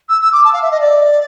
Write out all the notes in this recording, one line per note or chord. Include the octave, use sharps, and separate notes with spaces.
E6
E6
D6
A5
F5
E5
D#5
D5